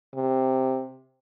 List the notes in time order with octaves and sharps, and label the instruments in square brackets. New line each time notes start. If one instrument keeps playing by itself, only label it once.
[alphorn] C3